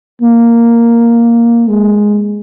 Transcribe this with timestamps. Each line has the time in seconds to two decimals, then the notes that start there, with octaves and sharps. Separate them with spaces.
0.21 A#3
1.68 G#3